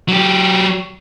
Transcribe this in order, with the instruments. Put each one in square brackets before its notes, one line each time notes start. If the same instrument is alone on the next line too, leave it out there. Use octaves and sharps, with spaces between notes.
[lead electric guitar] F#3 G4